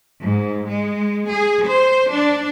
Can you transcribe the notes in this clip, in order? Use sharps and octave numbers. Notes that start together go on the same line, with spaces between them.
G#2
G#3
G#4
C5
D4